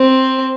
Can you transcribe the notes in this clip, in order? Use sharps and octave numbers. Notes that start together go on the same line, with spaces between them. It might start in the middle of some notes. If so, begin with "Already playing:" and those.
Already playing: C4